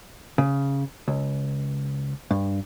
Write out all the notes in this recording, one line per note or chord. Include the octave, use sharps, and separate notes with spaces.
C#3
C#2
G2